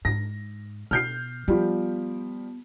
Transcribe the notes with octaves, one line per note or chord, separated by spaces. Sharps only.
G#2 A#6
B2 F6 G6 C7
F3 G3 B3